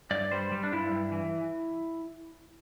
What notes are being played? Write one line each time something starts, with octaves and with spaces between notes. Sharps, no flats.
G2 D5
G3 C5
G3
D4
G2 E4
G2
E3